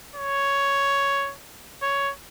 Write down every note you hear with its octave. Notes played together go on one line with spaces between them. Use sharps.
C#5
C#5